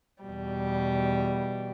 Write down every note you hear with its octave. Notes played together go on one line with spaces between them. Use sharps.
E2 B2 G3